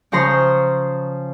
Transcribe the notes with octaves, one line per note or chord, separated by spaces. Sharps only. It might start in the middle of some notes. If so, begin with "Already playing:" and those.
C#3 F3 C#5 A#5 C6